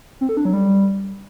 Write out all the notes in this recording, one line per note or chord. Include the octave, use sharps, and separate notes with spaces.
C4
A4
D4
F#3
G3